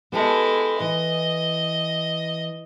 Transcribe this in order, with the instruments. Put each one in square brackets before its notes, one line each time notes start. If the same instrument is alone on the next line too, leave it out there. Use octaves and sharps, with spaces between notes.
[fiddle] G#3 E4 [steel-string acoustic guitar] B3 G4 A4
[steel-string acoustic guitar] E3 [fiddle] D#5